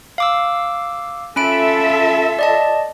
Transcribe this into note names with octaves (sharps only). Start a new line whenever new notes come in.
F5 D6 E6
C#4 F4 A4 E5 B5 D7
D5 D#5 A5